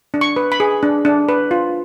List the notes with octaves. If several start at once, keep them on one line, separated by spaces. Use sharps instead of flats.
D4
C#6
B4
B5
G#4
D4
D4
B4
F4